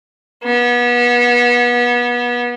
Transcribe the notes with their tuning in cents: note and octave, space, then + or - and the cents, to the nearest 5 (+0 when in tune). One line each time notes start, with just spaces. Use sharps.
B3 -30